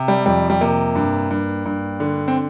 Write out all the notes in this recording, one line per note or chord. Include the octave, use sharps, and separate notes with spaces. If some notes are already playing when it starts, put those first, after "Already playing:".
Already playing: C3
G3
F2 G3
G3
C3 A#3
G2
G2
G2
D3
C4